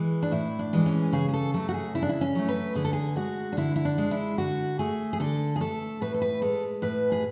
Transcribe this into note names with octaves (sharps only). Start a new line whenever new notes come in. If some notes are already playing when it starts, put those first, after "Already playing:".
Already playing: E3 G#3
D4
A2 E4
D4
E3 G#3
C#4
C#3 G#4
G#4
A4
F#3 A3 A4
F#4
G#4
C#3 E4
D4
E4
C#4
F#3 A3
B4
D3 G#4
A4
G#4
G#3 F#4
D4
D3 E4
E4
D4
G#3
E4
D3 F#4
A3 G#4
G#4
D3 A4
G#4
A3 A4
A2 B4
A4
B4
G#3 A4
A2 B4
G#4